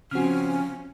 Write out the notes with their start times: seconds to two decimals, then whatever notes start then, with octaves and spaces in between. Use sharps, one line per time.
0.11 C#3 F3 C4 C#4 F#4 G#5 F6